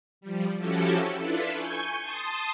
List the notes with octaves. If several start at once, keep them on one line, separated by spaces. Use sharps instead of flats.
F3 G3
F3 C#4 E4 F#4 G4 A4
D4 E4 F4 A4 B4
G#5 C#6 G6
A5 C6 D#6